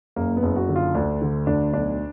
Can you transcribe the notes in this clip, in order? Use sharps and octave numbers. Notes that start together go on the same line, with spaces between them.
F#1 A#3
B3
F#1
F#4
D3
F4
D2 D4
D3
D2 D4
B1 D4